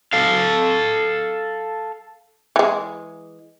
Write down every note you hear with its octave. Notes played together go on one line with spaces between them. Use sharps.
A4 F5
E3 G#3